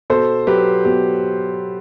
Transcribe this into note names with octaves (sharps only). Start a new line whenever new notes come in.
B2 A4 C5
F#3 G4 B4
B2 G4